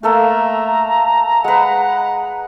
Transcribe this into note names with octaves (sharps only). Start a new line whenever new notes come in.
A3 A#3 A4 A#4 A#5
G#3 B4 F#5